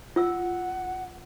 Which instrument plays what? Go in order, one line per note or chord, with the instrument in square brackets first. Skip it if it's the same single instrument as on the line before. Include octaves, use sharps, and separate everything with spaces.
[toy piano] F4 E6 [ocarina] F#5